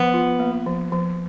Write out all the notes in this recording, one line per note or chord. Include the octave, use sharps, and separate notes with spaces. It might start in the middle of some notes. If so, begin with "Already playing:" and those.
Already playing: F3 B3
F4
A#3
F3
F3